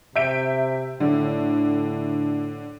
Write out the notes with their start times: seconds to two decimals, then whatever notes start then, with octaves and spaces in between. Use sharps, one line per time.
0.16 C3 E5 G6 D7
1.00 A2 D3